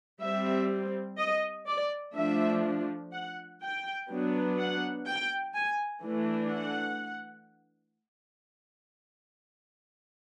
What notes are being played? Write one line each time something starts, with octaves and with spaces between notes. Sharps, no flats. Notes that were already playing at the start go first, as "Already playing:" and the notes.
G3 C4 E5
D#5
D5
F3 A3 D4 E5
F#5
G5
F#3 B3 D4
F#5
G5
G#5
E3 A3 D4
F#5